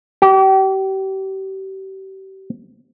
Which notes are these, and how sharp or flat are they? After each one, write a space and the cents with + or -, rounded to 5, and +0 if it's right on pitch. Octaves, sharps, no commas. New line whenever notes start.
G4 -35